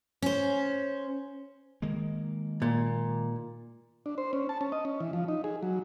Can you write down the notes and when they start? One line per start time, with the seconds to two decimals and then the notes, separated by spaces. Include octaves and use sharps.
0.22 C#4 C5
1.82 D#3 G#3 A#3
2.62 A#2
4.06 D4
4.18 C5
4.33 C#4
4.49 A5
4.61 C#4
4.72 D#5
4.85 C#4
5.00 E3
5.13 F3
5.28 D#4
5.44 G#4
5.63 F#3